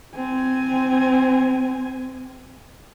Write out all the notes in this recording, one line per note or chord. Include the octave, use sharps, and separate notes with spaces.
C4 G#5